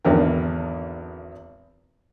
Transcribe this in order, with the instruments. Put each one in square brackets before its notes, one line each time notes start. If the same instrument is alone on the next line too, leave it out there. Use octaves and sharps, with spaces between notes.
[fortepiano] G#1 E2 D3 A#4 G5